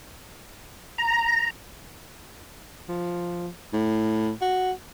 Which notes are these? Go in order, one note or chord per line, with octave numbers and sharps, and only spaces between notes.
A#5
F3
A2
F#4